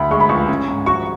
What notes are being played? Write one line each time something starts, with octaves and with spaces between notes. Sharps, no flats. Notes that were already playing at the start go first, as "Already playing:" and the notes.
Already playing: D2 B5
G#3 C#6
B5
C#2 C#6
C#4
G#2
F#4 C#6